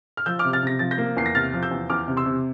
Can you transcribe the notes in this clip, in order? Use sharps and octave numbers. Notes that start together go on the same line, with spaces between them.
F6
F3 E6 G6
D6 F6
C3
F6 A6
C3 A#6
F3 A6
G6 A#6
A#3
E2 C7
A#6
C3 F6 A6
F3
E6 G6
E2
E2 D6 F6
C3
C6 E6
C3